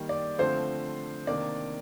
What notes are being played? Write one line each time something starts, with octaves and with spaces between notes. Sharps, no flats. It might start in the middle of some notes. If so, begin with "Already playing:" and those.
Already playing: D#3 G3 A#3
D5
D3 F3 A3 C4 C5
C3 D#3 A#3 D4 D5